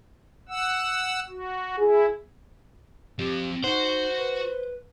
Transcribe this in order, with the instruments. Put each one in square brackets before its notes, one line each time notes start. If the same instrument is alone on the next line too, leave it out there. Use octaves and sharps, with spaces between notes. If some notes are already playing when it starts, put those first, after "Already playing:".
[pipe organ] F#5 E6
F#4
[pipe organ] E4 [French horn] G#4
[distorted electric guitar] F3 C4 [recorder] G4
[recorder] D#4 [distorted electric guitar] F#4 F#5 [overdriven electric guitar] C5
[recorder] B4